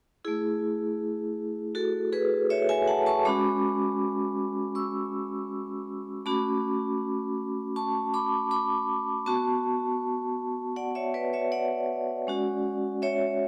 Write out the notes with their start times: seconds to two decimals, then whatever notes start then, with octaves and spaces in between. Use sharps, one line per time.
0.25 A3 E4 G#4
1.75 F#4 A4
2.12 G#4 B4
2.50 C#5 E5
2.69 E5 G#5
2.87 F#5 A5
3.06 A5 C#6
3.25 G#3 C#4 F#4 B5 D6
4.75 C#6 E6
6.26 A3 C#4 F#4 B5 D6
7.76 A5 C#6
8.14 B5 D6
8.51 B5 D6
9.26 B3 F#4 A5 C#6
10.76 D5 F#5
10.95 C#5 E5
11.14 B4 D5
11.33 C#5 E5
11.52 D5 F#5
12.27 G#3 C#4 F#4
13.02 C#5 E5